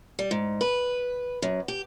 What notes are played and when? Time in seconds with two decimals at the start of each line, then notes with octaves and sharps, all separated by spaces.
0.19 G3
0.31 G#2
0.61 B4
1.42 F#2
1.68 G4